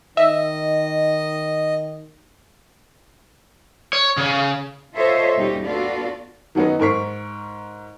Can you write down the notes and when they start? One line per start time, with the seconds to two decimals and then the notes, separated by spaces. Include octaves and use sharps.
0.17 D#3 D#5 E5
3.93 C#5
4.17 C#3
4.95 F4 A4 C5 C#5 D#5 E5
5.35 D#2 B2 G3 C#4 D#4 G4
5.65 B3 D4 F4 F#4 A4 D5
6.55 D#3 F#3 B3 C#4 D#4
6.79 G#2 A#4 C#6 B6